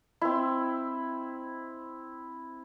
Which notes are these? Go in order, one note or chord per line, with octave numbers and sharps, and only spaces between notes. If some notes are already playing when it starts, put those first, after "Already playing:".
C4 E4